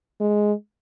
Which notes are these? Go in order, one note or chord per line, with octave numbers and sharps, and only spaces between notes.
G#3